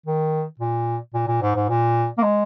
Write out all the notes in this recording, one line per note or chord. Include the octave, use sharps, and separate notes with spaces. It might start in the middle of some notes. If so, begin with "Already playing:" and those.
D#3
A#2
A#2
A#2
G#2
G#2
A#2
A#3
G#3